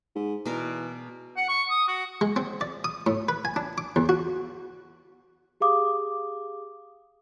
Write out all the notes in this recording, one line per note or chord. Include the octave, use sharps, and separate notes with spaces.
G#2
B2 E3 A#4 D5
F#5
C#6
D#6
F#4
G#3
C4
D5
D#6
A2
B4
G#5
D4
D6
E2
F#4
G4 G#4 F5 D6 D#6